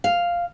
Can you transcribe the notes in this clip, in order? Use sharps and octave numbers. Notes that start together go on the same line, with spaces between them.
F5